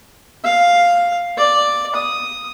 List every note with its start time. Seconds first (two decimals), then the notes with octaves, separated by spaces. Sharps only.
0.44 F5
1.37 D5
1.95 D#6